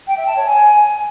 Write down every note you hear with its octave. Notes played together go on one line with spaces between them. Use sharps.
G5
E5
A5
C#5
G#5